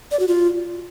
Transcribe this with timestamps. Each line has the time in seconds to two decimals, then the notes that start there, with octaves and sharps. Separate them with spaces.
0.11 D5
0.20 F#4
0.28 F4